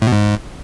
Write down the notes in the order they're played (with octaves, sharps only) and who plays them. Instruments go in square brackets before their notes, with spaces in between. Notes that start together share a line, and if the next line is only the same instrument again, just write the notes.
[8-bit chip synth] A2
B2
G#2